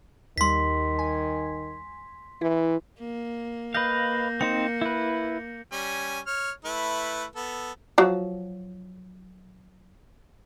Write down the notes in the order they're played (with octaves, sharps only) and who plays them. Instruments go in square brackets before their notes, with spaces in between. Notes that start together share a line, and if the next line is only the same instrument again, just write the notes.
[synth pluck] D#2 G3 [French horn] D#3 [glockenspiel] C6 B6
[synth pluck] G#5
[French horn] E3 [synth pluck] E4
[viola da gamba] A#3
[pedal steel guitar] B4 D#5 F5 [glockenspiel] G6 A#6
[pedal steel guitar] C4 D#4 C5 [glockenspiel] C#7
[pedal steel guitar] E4 B4
[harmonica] G3 C#4 G#5
C#5 F6
A3 E4 B4
B3 A4
[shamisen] F3 F#3